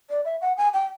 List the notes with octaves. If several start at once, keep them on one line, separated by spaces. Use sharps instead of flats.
D5
E5
F#5
G#5
G5